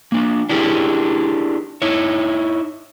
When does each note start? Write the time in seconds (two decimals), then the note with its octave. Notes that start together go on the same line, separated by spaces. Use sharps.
0.12 A#3 D4
0.50 D4 E4 G4 G#4 A#4
1.82 D#4 E4 C#5